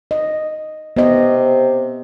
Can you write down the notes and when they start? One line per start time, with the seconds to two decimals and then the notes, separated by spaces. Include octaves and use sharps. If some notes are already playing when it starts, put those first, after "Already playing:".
0.11 D#5
0.97 C3 B3 D#5